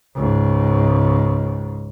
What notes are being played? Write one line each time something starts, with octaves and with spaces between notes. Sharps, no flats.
C#2 G#2